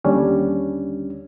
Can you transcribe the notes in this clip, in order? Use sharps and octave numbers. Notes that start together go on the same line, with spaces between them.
D#2 D3 G3 C#4 D4